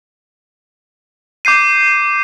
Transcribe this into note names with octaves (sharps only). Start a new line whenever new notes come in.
D6 G6 C7 D#7